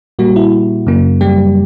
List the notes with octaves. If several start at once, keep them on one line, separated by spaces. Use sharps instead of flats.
A#2 G3 A#3 F#4
E4
F#2 C#3 F#3 A#3
G3 G4